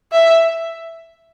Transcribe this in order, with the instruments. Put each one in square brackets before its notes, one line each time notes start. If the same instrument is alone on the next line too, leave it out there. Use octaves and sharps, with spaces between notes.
[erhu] E5